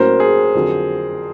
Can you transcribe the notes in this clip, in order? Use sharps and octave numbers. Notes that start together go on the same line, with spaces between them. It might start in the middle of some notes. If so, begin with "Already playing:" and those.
Already playing: A2 F#3 A#3 C#4 F#4 A#4 C5
G#4
F2 D3 F#3